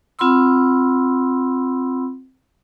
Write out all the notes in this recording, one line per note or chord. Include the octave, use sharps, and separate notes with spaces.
C4 F4 F#5 B5 C6 E6